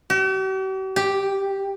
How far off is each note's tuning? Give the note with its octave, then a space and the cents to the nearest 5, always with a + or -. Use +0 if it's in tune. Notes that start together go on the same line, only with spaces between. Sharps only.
G4 -45
G4 +0